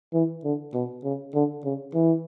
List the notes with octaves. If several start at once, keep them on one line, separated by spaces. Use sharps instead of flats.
E3
D3
B2
C#3
D3
C#3
E3